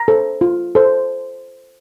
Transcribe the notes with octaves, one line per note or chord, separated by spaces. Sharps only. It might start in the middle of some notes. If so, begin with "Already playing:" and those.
Already playing: A#5
A4 C5
F4
A4 C5